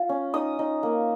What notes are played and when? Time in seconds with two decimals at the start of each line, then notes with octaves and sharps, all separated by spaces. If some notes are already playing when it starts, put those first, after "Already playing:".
Already playing: F4
0.09 C#4
0.34 D#4 D#6
0.59 D#4
0.83 A#3